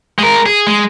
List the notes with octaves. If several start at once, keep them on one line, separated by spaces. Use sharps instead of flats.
G#3 A#4
G#4
G#3